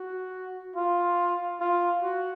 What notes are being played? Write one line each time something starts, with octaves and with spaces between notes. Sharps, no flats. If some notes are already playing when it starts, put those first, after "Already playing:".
Already playing: F#4
F4
F4
F#4